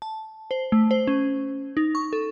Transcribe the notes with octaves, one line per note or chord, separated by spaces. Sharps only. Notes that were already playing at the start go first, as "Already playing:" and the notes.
A5
C5
A3
C5
C#4
D#4
C#6
A4